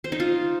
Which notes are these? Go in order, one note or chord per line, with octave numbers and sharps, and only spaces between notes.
C5
D#4
F4